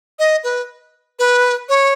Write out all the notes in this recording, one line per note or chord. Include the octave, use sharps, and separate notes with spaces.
D#5
B4
B4
C#5